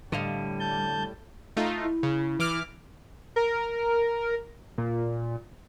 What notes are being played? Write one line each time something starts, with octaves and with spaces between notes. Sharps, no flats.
A2 D3 G3 D#5 F5
A5 G6
A3 D#4 F4
E4
C#3
E3 D6 F6
A#4
A#2